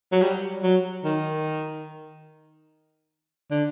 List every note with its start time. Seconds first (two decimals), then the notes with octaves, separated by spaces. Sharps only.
0.12 F#3
0.22 G3
0.63 F#3
1.04 D#3
3.51 D3